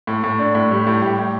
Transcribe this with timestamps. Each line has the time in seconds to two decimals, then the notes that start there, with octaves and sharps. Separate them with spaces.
0.07 A2
0.23 A2
0.39 D4
0.55 A2
0.71 G3
0.87 A2
1.02 A2 G4
1.19 A2